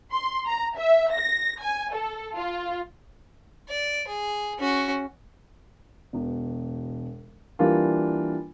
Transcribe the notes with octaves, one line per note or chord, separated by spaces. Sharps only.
C6
A#5
E5
A#6
G#5
A4
F4
D5
G#4
C#4 F#4
E1 B2
E3 G3 A#3 D4 F4 A#4